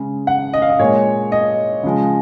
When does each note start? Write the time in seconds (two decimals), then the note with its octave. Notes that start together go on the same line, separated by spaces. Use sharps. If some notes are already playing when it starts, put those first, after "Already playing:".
Already playing: C#3 G#3
0.27 F#5
0.53 D#5
0.62 F5
0.70 D#5
0.79 A#2 G#3 C#5
1.32 D#5
1.83 C#3 F3 G#3